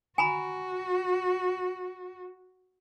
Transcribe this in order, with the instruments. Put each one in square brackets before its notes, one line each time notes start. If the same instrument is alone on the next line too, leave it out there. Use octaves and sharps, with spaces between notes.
[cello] F#4 [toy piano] G#5 A#5 B5